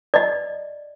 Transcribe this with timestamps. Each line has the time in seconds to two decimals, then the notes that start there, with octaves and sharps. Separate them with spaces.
0.14 D5 D#5